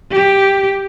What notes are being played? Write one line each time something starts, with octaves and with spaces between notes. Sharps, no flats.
G4